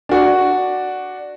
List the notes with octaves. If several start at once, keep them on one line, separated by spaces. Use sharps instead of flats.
D4 F#4 D5